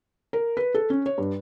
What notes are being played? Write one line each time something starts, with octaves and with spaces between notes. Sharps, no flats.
A#4
B4
A4
C#4
C#5
G2